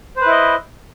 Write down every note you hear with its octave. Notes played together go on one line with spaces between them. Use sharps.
E4 B4 C5 D#5